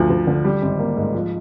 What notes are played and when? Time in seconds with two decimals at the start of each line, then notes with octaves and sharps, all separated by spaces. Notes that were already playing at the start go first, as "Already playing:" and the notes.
Already playing: D2 F3
0.10 D2
0.27 D3
0.45 G3
0.62 G#1
0.79 A#3
0.97 G#2
1.14 F3